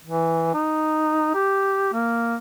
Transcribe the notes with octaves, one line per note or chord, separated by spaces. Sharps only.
E3
D#4
G4
A#3